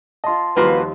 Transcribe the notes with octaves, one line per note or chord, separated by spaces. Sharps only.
F4 D#5 A5 C6
D#2 F3 G3 A#3 F4 F#4 B4